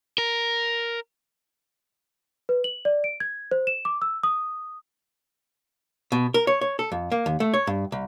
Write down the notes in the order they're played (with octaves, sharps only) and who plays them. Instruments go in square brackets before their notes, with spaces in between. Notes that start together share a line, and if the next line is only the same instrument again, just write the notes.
[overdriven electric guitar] A#4
[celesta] B4
F#7
D5
D7
G#6
C5
E7
D6
E6
D#6
[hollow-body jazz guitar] B2
A#4
C#5
C#5
A4
F2
A#3
D#2
A3
C#5
G2
C2